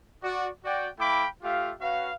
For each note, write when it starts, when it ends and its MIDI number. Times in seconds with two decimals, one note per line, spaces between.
0.24 0.49 66
0.24 0.49 74
0.65 0.89 66
0.65 0.89 74
0.65 0.89 79
0.99 1.26 57
0.99 1.26 64
0.99 1.26 77
0.99 1.26 79
0.99 1.26 83
0.99 1.26 86
1.43 1.73 57
1.43 1.73 65
1.43 1.73 67
1.43 1.73 76
1.43 1.73 77
1.81 2.13 61
1.81 2.13 66
1.81 2.13 71
1.81 2.13 77